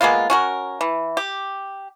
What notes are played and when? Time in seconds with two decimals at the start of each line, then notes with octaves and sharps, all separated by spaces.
0.01 G#3 A#3 B3 F4
0.30 C#4 F#4 A#4
0.81 E3
1.17 G4